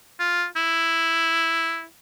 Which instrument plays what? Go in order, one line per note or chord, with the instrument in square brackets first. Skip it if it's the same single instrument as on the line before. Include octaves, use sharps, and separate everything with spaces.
[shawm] F4
E4